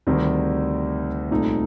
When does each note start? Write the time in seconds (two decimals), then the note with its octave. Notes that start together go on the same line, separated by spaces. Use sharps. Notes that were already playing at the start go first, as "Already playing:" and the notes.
0.07 D2 C3 D#3 G3
1.31 C2 A#2 A3 D#4